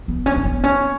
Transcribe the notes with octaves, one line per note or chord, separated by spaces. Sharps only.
B3
C#4
C#4
B3
C#4